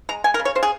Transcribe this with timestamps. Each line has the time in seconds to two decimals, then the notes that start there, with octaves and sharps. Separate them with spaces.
0.09 G#3 A#5
0.24 G#3 G#5
0.34 A#4
0.39 C#3
0.45 C#5
0.55 C#3 C5
0.63 G#4